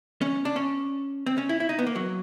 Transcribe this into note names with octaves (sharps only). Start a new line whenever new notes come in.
C#4
D4
C#4
C4
C#4
E4
E4
D#4
B3
A#3
F#3